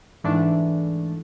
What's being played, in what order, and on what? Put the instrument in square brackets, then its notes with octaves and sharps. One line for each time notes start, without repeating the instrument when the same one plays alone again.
[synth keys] G#2 E3 A3 D4